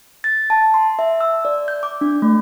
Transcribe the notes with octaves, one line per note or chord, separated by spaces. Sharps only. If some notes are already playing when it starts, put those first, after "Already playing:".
A6
A5
C6
E5
E6
D5
G6
D6
D4
A3